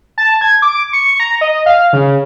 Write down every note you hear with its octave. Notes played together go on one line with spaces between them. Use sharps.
A5
G#6
D6
C#6
C#6
A#5
D#5
F5
C#3